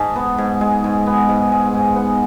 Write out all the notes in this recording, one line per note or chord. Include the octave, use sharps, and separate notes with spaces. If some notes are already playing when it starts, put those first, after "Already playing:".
Already playing: G#2 G#3 A5
B3
G#2
G#3
G#2
B3
G#2
G#3
G#2
B3 F#5